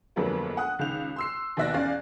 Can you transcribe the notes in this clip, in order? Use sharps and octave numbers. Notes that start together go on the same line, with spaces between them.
G1 F2 F#3 G#3 A#3 B3
F#5 D#6 F#6
C#2 D#3 F5 G6 F7
C6 E6 C7
D#2 B2 D5 E5 F#6 A#6
E2 C#4 D5 F5